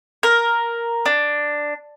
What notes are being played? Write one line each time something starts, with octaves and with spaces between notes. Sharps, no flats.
A#4
D4